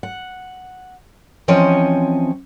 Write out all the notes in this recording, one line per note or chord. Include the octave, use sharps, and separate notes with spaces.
F#5
E3 F3 C4 C#4 C#5 D#5